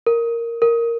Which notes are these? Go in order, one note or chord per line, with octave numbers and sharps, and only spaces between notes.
A#4
A#4